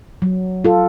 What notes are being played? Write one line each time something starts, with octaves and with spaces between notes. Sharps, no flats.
F#3
F4 A4